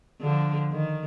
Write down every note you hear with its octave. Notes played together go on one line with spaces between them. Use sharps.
D3 F3
D#3